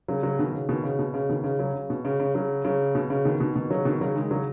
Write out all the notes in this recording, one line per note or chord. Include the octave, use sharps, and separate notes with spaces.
C#3 F#3
C#3 F#3
B2 D#3
C#3
B2 D#3
C#3
B2
C#3
B2 D#3
C#3
C#3 F#3
C#3
B2
C#3
C#3
C#3 F#3
C#3 F#3
B2
C#3
B2 D#3
B2 D#3
B2 D#3
C#3 F#3
B2 D#3
C#3 F#3
D#3 G#3
C#3 F#3